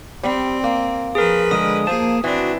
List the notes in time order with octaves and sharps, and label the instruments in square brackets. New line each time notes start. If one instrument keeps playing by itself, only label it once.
[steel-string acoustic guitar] G3 [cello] C4
[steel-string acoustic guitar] A#3
[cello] F3 B4 [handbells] G#4 A#4
[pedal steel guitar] D3 G#3 A#4 [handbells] D#6
[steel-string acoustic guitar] F3 [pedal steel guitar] A#3 A5 [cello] G#4
[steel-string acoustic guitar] E3 [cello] C4 D4 [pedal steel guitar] F#4